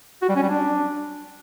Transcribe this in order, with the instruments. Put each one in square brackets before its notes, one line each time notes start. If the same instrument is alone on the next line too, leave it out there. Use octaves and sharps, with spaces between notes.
[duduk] F#4
G3
C#4
G3
D4